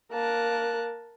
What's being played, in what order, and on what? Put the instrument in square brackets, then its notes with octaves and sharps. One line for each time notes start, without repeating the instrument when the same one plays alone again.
[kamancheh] A#3 [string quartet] A#4 A5 F#6